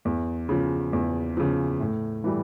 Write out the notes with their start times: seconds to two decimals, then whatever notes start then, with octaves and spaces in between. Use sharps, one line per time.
0.05 E2
0.49 C#3 F3
0.93 E2
1.37 C#3 F3
1.80 A2
2.24 E3 G3